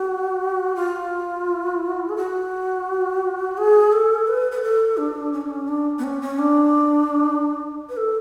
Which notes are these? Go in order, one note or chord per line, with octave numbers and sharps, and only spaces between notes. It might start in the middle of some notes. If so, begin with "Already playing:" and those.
Already playing: F#4
F4
G#4
F#4
G#4
A4
B4
B4
A4
D4
C#4
D4
C#4
D4
B3
C#4
C#4
D4
B4
A4